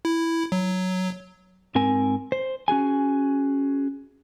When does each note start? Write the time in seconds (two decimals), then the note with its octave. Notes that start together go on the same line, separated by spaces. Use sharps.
0.05 E4
0.52 F#3
1.75 G#2 C4 A#4 G#5
2.32 C5
2.68 C#4 F#4 G#4 G#5